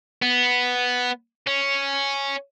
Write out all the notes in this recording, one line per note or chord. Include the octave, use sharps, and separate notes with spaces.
B3
C#4